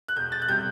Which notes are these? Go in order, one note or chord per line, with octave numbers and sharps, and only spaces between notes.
F#6
E1 G6
A6
F#6
C3 G3 G6